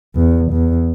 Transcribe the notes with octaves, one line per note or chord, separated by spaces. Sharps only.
E2
E2